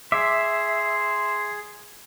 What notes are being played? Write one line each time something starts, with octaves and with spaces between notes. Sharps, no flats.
G#4 E5 C6 D6